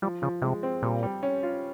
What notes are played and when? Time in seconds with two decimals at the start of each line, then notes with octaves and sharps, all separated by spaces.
0.02 F3 G3
0.22 C#3 F3
0.42 C3 G#3
0.63 C4
0.83 A#2 G3
1.03 G3
1.23 C#4
1.43 F4